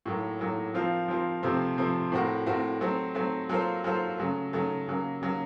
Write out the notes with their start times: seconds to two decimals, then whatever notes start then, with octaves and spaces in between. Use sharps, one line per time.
0.06 A2 F#3 A#3
0.39 A2 F#3 A#3
0.74 F3 C4 F4 A#4
1.08 F3 C4 F4 A#4
1.43 C3 F3 A3 C4
1.77 C3 F3 A3 C4
2.12 A2 A3 C4 F#4 A#4
2.46 A2 A3 C4 F#4 A#4
2.81 F#3 A3 C4
3.15 F#3 A3 C4
3.49 F#3 A#3 F4 A4 C5
3.84 F#3 A#3 F4 A4 C5
4.18 C#3 F#3 A3
4.53 C#3 F#3 A3
4.87 C#3 F#3 A#3
5.21 C#3 F#3 A#3